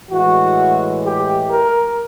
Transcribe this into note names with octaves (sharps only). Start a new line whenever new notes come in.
A2 E3 G#3 F#4
G4
A#4